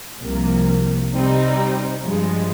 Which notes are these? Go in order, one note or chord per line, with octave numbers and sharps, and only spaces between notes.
C2 C3 F3 A#3
C3 G3 C4 D#4
G2 F3 G#3